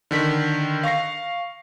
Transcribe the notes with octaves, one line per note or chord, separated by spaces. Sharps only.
D3 D#3 B6
F5 C#6 A#6 C7